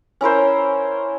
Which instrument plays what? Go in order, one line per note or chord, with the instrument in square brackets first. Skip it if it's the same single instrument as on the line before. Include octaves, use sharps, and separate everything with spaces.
[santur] C#4 E4 A#4 C5